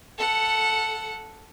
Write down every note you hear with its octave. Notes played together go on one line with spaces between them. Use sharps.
A4 F#5